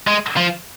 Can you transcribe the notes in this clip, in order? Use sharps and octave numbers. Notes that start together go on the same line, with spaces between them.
G#3
F3